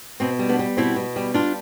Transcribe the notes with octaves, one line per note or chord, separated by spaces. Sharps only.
B2 C4
G3
B3 D4
G3
B2 C4 E4
B2
G3
G3 D4 F4